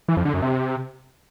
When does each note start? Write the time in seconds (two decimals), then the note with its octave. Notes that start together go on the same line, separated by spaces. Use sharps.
0.08 E3
0.17 F2
0.25 D3
0.34 F#2
0.42 C3